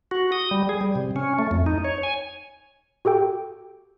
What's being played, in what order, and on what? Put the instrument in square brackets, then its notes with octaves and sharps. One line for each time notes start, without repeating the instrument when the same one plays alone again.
[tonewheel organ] F#4
D#6
G3
G#4
G3
C3
C#4
A3
F2
D#4
C#5
G#5
[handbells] F#4 G4 A4 G5